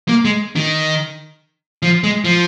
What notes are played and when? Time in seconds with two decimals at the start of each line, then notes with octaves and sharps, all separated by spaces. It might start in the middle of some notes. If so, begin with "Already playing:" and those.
0.09 A#3
0.25 G#3
0.56 D#3
1.82 F3
2.04 G#3
2.25 F3